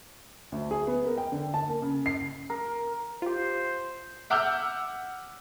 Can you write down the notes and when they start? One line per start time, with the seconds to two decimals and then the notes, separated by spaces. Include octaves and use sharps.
0.52 D2
0.71 G#4
0.87 B3
1.05 A#4
1.18 G5
1.32 D3
1.54 A5
1.68 A#3
1.82 C#3
2.06 C7
2.50 A#4
3.22 F4 G4 C5
4.30 E5 F#5 D6 E6 F6 G6